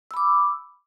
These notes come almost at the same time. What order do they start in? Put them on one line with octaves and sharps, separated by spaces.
E6 B5 D6